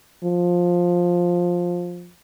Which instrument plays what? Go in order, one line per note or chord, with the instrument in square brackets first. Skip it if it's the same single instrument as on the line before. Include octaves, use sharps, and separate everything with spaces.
[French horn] F3